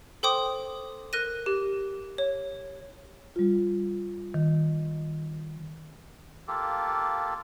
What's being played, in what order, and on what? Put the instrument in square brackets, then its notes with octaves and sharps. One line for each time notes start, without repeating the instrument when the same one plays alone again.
[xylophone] A4 C5 G5 C6 D6 D#6
A#4 F#6 A#6 D#7
G4
C#5
[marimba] G3 F4
D#3
[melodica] A#3 F4 G4 A4